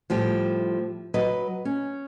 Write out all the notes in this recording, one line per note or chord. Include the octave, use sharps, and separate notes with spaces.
A2 F3 G3 G4
F#3 B4 D#5
C#4